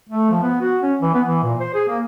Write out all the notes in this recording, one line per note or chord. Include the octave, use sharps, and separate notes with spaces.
A3
F3
B3
F#4
C#4
E3
B3
E3
A#2
C5
G#4
A#3